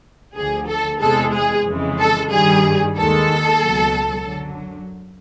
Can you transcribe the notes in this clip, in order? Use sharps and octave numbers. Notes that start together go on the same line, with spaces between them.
D2 D3 F3 G#4
A4
E2 C3 E3 G#3 A4
G#4
F2 C#3 E3 G#3
A4
G2 D#3 G3 G#4
D#2 D#3 G#3 A4
C#2 B2 F#3
F#2 D3 F#3